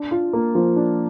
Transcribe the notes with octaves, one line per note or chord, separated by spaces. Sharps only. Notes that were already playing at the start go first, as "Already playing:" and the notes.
Already playing: D4
F4
A#3
F3
D4